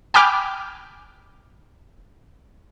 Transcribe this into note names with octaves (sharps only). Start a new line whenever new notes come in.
G5 G#5 B5 D6 F6 G6